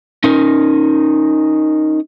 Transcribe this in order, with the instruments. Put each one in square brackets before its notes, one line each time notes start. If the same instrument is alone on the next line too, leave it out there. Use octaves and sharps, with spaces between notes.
[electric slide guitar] C#4 D#4 A#4